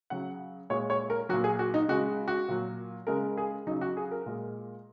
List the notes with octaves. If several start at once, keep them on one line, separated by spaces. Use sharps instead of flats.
C#3 F#3 F#5
A#2 G#3 C#5
C#5
A#4
A#2 F#3 F#4
G#4
F#4
D#4
C#3 G#3 F#4
F#4
A#2 F#3
C#3 G#3 A#4
G#4
C#3 F#3 D#4
F#4
G#4
A#4
A#2 G#3